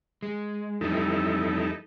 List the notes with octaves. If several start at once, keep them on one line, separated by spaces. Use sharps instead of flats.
G#3
F2 E3 G3 D#4 E4 A4